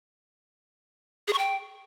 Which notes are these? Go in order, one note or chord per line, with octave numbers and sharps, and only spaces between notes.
G#4
C#6
G5